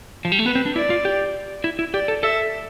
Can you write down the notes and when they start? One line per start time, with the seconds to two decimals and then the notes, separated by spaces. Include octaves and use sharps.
0.25 F3
0.32 G3
0.39 A3
0.46 B3 B4
0.55 C4
0.66 D4
0.76 E4 D5
0.90 F4
1.05 G4
1.64 E4
1.79 E4
1.93 G4 D5
2.08 A4
2.23 A4 E5